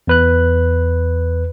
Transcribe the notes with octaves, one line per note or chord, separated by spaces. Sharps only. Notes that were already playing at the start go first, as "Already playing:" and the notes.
E2 B4 F#6